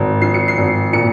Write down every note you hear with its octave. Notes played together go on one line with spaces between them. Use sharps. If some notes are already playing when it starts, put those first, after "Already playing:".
Already playing: G#1
F3 C7
C#7
C7
G#1
A#2 C#7